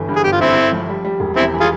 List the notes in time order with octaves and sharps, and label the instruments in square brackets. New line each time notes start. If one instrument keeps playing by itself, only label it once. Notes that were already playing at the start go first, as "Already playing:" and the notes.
Already playing: [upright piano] G1 E3
G2
[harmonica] G#4
[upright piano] G1 [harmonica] G4
[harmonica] F4
[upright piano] G1 [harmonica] C4 E4
[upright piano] G1
F3
G3
G3
E1
[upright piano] E2 [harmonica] C4 E4
[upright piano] E3
[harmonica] F4 G#4